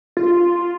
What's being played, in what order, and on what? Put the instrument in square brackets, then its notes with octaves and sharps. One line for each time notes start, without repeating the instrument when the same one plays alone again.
[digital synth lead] F4